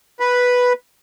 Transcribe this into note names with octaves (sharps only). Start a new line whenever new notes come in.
B4